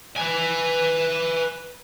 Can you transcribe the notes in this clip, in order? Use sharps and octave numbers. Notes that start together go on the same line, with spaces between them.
B4 G#5